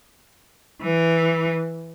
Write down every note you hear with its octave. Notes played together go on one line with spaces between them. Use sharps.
E3